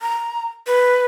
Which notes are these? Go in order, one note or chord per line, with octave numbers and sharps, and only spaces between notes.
A#5
B4